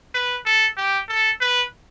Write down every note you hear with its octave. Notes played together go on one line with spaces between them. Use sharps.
B4
A4
G4
A4
B4